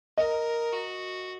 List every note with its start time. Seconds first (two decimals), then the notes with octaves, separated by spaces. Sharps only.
0.18 A#4 D#5
0.72 F#4